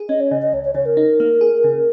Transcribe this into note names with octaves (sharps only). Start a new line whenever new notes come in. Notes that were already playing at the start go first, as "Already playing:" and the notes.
Already playing: G#4
C#4 D#5
C#5
C#3 D#5
D#5
C#2 C#5
C#5
C#3 C#5
A#4
D#4
A#3
G#4
C#3